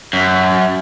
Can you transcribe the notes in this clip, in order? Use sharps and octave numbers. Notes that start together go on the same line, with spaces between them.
F#2